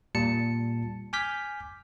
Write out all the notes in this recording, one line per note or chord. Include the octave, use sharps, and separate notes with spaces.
A#2 G3 A5 C#7
G#5 D6 F6 G6 B6